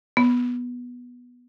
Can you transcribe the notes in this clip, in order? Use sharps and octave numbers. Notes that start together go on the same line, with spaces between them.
B3